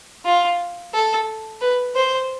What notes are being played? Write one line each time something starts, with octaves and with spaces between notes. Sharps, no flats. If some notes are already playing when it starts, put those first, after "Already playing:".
F4
A4
B4
C5